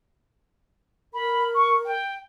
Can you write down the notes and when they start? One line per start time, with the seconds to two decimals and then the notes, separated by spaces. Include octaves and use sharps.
1.14 A#4 B5
1.54 C#6
1.85 G5